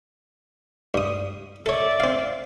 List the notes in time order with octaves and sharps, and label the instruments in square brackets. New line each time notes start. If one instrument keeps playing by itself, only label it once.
[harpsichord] G2 D#6
[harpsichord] A4 C#5 [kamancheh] D5 E5
[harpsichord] C4 F5